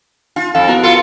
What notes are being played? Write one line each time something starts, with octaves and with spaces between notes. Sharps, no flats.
D#4 F4
F2 A4 F5
B2 E4 A#4 C5
F4 A4